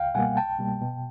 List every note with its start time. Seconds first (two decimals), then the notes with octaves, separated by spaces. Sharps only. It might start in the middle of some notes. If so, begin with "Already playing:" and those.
Already playing: C#2 F5 G5
0.15 B2 G3 A#3 F#5 G#5
0.37 C2 G5 A5
0.59 B2 G3 A#3
0.81 B2